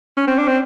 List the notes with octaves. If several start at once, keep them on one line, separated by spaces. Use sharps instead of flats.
C#4
C4
D4
C4